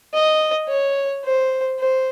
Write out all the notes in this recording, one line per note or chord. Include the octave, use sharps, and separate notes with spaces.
D#5
C#5
C5
C5